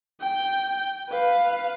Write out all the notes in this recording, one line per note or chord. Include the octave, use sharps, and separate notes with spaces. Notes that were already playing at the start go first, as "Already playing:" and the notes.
G5
B4 F5